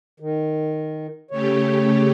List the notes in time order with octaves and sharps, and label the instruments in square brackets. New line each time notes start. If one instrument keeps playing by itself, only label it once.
[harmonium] D#3
[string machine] C#3 A3 G4 [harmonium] C#5